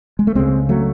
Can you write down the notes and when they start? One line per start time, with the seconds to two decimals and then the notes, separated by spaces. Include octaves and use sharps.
0.19 G#3
0.27 A3
0.35 C#2 C#3 G#3 C4
0.69 F#3 A3